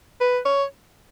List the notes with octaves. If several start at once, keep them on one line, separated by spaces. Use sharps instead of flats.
B4
C#5